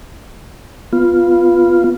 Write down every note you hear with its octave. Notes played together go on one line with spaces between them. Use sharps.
B3 F4